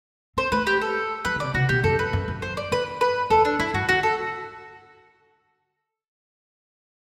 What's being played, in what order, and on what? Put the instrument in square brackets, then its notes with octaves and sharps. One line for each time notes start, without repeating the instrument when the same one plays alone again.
[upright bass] C4 [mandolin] C5
[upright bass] A3 [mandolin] B4
[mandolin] G4
A4
[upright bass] F#3 [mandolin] B4
[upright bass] D3
[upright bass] C3 [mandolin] D5
[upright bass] C3 [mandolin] F#4
[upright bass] B2 [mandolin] G4
[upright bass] F#2 [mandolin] A4
[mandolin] B4
[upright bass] F#2
F#2
[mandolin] C5
D5
[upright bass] G2 [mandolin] B4
[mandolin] B4
[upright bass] E2 [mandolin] A4
[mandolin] D4
[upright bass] G2 [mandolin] E4
[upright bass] G2 [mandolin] F#4
[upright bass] D3 [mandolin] F#4
[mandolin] A4